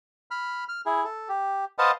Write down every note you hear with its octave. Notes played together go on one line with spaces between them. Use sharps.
B5 F6
F6
E4 G#4
A4
G4
B4 C5 D#5 F5 F#5 A5